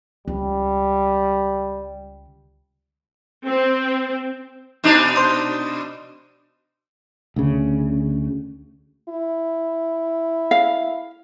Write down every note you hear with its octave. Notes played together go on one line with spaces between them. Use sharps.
C#2 G3
C4
B2 D4 D#4
C5 D#5
D2 C#3
E4
F5